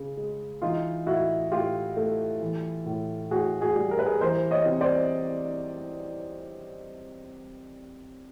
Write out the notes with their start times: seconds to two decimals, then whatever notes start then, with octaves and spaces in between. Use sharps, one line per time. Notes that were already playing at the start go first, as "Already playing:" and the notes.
Already playing: C#3
0.17 G#3
0.62 E3 D#4 F4
1.07 A2 E4 F#4
1.52 A2 F4 G4
1.97 A3
2.41 E3
2.86 A2
3.31 A2 F#4 G#4
3.61 F#4 G#4
3.76 G3
3.91 A#4
3.99 B4
4.06 G#4 A#4
4.21 E3 A#4 C5
4.51 C#5 D#5
4.66 C3
4.81 C5 D5